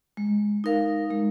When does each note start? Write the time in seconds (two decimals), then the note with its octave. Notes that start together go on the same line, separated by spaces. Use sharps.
0.17 G#3
0.64 D#4 A#4 F5
1.11 G#3